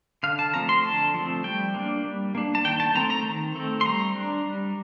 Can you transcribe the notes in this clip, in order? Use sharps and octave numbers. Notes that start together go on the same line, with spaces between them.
D3 F5
A5
F3 A3 C4 A#5
C6
D3 A5
F3 A3 C4
G3 G5
A#3 D4
G3
A#3 D4
A5
D#3 G5
A5
A3 C4 A#5
A#5
D#3
A3 C4
C6
G3 A#5
D4
G3